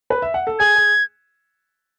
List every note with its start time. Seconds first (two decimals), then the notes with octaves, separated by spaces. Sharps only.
0.10 B4
0.22 E5
0.34 F#5
0.47 A4
0.59 G#4 G#6
0.76 G#4